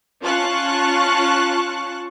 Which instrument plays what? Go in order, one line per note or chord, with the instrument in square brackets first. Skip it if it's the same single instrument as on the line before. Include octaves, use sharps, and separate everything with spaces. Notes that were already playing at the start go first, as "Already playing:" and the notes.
[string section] C#4 F4 A5 C#6 F#6